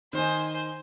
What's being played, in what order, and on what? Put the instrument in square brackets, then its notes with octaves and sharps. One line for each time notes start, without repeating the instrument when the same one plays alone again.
[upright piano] D#3 D#4 [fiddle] C5 G#5